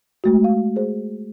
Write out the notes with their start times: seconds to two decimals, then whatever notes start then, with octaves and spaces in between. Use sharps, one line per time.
0.24 G#3 A3 F#4
0.44 F5
0.76 G#4 C5